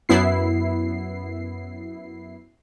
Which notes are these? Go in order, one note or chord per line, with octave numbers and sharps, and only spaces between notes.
F#2 B3 E4 C7